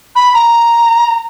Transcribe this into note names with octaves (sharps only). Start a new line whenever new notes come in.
B5
A#5